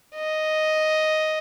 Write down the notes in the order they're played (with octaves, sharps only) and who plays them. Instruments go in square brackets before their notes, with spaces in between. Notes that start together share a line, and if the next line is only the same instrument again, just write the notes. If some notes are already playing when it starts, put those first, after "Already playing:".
[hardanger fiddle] D#5